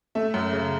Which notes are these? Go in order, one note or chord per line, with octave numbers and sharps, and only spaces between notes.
A3 E5
F#2
C#3